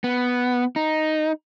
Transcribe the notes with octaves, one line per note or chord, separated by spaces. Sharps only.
B3
D#4